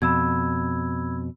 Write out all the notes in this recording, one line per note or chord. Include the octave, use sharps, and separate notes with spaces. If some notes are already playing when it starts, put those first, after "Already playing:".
F2 B2 B5 E6 G#6